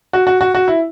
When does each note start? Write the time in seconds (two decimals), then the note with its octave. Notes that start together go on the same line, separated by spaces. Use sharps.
0.13 F#4
0.27 F#4
0.41 F#4
0.55 F#4
0.68 E4